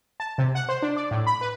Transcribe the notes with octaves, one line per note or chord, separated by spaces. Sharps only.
A5
C3
F#5
C5
D4
D5
A2
B5
B4